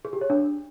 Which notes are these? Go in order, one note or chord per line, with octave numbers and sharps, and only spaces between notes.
G#4
G4
C#5
D4